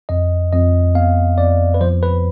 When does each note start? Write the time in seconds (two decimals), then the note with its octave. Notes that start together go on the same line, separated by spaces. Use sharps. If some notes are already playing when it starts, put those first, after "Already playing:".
0.09 F2 D#5
0.53 F2 D#5
0.95 B3 F5
1.37 F2 D5
1.74 B4
1.81 F3 C5
2.03 B4